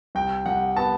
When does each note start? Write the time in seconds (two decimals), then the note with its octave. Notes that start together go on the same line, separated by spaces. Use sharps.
0.15 C2 G5
0.46 C2 F#5
0.77 B3 A5